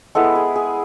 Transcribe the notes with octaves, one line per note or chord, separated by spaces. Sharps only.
G#3 B3 E4 A4
G#4
G#4